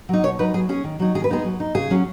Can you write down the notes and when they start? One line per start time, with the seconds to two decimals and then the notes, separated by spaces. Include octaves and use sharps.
0.09 F#3 D#4
0.23 B2 C#5
0.39 F#3 D#4 B4
0.54 F#3 G#4
0.69 C#4 G#4
0.84 D#3
0.99 F#3 D#4
1.14 D#3 G#4
1.24 B4
1.29 G#3 B3 D#4 G#4
1.44 F#3
1.60 D#4
1.75 C#3 G#4
1.90 F#3 C#4